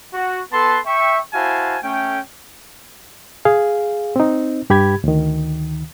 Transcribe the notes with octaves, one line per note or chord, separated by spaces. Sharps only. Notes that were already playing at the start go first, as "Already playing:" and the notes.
F#4
B3 A4 B4 A5 C6
E5 G5 C#6
E4 F#4 C5 F5 G#5 A5
A3 C#4 G5
G#4 F5
C4 D#4
G2 G4 B5 G#6
D2 D#3